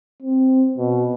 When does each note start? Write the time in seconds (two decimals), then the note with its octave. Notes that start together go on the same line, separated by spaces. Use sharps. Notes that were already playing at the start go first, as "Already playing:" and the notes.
0.23 C4
0.78 B2